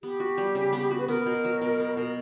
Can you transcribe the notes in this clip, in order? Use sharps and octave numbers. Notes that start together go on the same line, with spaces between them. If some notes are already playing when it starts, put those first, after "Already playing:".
B3 G4
F#4
G3
C#3
B3
F#4
B4
B3 A#4
B2
F#3
B2
B3
B2